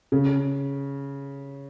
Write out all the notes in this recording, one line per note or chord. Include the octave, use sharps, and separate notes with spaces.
C#3